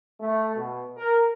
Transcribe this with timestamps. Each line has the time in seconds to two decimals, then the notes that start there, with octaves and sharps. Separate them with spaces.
0.20 A3
0.56 B2
0.97 A#4